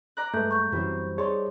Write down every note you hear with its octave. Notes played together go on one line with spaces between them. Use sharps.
D5 A#5 F#6
G2 G#3 A3 B4 G6
C#6 G6
F#2 E3 F#3 G3 C4
D#4 G#4 C#5 D5 A5 C6